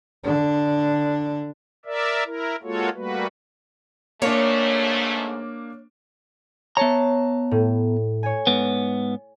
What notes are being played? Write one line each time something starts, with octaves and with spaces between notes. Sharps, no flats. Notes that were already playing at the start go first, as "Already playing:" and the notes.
D3 D4
A#4 D5 E5
E4 A#4
G#3 A#3 F4 F#4 A4 C#5
G3 A3 A#3 F#4 B4
G#2 A3 A#3 D4 C#5
B3 C#5 E5 A5 A#5
A2
C#5 G#5
G#2 B3